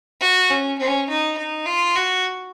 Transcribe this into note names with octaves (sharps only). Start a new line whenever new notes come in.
F#4
C#4
C#4
D#4
D#4
F4
F#4